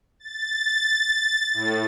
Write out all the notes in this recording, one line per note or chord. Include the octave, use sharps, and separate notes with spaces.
A6
A2